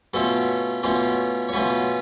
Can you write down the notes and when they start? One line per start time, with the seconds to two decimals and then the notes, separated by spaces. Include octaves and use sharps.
0.13 B2 A3 C#4 F4 A4
0.83 B2 A3 C#4 F4
1.49 C#5
1.53 B2 A3 C#4 F4 B4